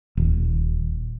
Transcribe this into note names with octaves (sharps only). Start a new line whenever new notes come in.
D#1